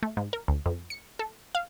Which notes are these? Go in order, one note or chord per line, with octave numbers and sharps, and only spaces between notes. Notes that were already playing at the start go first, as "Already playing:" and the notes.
A3
G#2
A#4
D2
F2
C#7
A4
F5